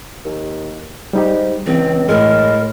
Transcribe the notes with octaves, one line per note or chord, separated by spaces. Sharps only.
D#2
G#2 G3 D#4 G4
C#2 E3 C4
A2 G#3 A#4